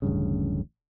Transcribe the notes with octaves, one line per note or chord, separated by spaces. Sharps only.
D1 A1 G2 C#3